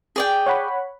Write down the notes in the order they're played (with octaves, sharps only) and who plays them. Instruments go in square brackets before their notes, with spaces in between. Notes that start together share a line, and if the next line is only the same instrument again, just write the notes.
[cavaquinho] G#4 D5 G5
[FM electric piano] C#5 F#5 B5